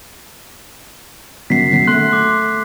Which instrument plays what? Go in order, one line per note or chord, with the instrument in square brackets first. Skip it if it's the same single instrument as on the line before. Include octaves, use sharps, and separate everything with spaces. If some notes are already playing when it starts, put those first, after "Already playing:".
[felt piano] F#1 F#2 F#3 [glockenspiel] B6 C7
[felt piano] F#3
[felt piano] A3 [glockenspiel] C6 F#6
[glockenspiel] D6